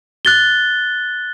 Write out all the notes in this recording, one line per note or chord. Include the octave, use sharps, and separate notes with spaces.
F#6 A6 G7